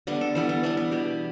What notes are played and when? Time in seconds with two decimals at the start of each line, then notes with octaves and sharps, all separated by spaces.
0.07 D3 G3 B3 D4
0.21 A4
0.35 E3 G3 B3 A4
0.49 B3
0.63 E3 G3 B3 D4
0.77 B3
0.91 B2 B3 G4